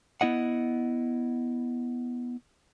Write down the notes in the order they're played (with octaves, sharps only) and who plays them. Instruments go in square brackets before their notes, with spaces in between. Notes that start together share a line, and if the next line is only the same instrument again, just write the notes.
[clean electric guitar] B3 E4 D#5 F#5